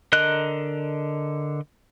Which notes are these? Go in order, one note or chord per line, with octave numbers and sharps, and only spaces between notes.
D3 A#4 D#5 F#6